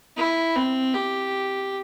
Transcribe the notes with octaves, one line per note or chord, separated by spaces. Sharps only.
E4
C4
G4